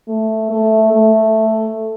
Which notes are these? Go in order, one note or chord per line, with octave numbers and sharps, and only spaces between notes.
A3
A3
A3